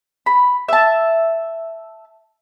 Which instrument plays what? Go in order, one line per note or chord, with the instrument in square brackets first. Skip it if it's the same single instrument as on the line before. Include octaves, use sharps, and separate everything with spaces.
[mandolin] B5
E5 A5